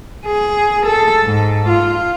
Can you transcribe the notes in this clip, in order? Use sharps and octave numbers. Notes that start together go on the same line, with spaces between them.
G#4
A4
G#2
F4